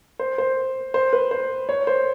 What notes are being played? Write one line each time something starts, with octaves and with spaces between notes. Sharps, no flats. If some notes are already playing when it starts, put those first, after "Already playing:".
C5
C5
C5
B4
C5
C#5
C5